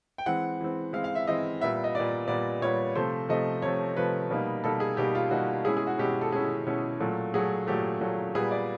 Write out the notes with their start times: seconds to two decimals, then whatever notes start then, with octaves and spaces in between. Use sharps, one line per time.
0.18 G5
0.26 E3 G#3 C4 F#5
0.60 E3 G#3 C4
0.93 E3 G#3 C4 F5
1.04 F5
1.15 E5
1.27 E3 G#3 C4 D#5
1.61 A#2 G3 B3 E5
1.84 D#5
1.95 A#2 G3 B3 D5
2.28 A#2 G3 B3 D5
2.61 A#2 G3 B3 C#5
2.95 C3 F3 A3 C5
3.29 C3 F3 A3 D#5
3.62 C3 F3 A3 C#5
3.96 C3 F3 A3 B4
4.30 B2 G3 A#3 D#4
4.64 B2 G3 A#3 D#4 A4
4.80 G#4
4.97 B2 G3 A#3 D#4 G4
5.15 F4
5.31 B2 G3 A#3 D#4 F#4
5.65 B2 G#3 C#4 E4 G#4
5.77 G#4
5.87 F#4
5.98 B2 G#3 C#4 E4 G4
6.21 A4
6.32 B2 G#3 C#4 E4 G#4
6.66 B2 G#3 C#4 E4
7.00 A#2 F#3 A3
7.34 A#2 F#3 A3 G#4
7.67 A#2 F#3 A3 G4
8.01 A#2 F#3 A3
8.35 A#2 G3 B3 G#4
8.51 D5